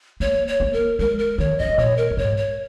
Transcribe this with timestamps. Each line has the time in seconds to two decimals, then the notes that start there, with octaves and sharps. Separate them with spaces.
0.20 A#3 C#5
0.48 C#5
0.60 A#3
0.73 A#4
0.99 G#3 A#4
1.19 A#4
1.38 D#3 C#5
1.59 F#2 D#5
1.69 G#2
1.78 A#2 C#5
1.97 A#4
2.11 F#2
2.17 G#2 C#5
2.37 C#5